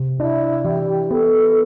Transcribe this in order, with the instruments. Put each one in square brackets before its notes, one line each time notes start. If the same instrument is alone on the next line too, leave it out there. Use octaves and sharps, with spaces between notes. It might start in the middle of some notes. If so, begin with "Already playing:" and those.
Already playing: [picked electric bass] C3
[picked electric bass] D4 [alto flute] E4
[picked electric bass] E3 [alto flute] G4
[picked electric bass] B3 [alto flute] A4